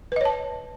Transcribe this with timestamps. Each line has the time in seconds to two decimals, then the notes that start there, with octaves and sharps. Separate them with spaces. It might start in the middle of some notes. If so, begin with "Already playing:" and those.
0.12 B4
0.16 D#5
0.21 C#5
0.25 A5